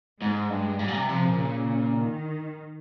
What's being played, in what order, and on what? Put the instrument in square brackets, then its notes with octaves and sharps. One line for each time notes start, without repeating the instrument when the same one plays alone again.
[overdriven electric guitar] G#2 [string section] G#3
[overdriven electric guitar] G2
[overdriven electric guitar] G#2 [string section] G3
[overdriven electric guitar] A#2
C3
[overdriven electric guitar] C3 [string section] F3
[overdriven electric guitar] A#2
[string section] C#3
D#3